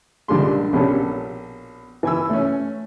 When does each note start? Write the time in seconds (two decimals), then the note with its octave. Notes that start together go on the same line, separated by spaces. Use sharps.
0.28 A#1 D3 G3 G#3 C6
0.73 A#1 B2 C#4 G4 A4
2.03 E3 G#5 E6
2.29 A3 C#4